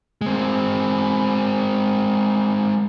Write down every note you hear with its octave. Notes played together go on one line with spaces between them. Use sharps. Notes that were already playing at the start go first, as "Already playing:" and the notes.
G#3 C4